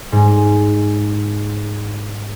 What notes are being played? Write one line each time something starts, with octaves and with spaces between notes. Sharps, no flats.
G#2 G#3